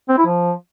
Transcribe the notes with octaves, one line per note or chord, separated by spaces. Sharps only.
C4
E4
F3